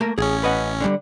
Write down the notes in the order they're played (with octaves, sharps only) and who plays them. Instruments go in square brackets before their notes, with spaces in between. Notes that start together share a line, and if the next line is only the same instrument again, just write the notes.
[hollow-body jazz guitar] A3 A#3 A#4
[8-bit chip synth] A1 C#4 [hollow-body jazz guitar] G#4
[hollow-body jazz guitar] B4 D#5 F#5
D3 G3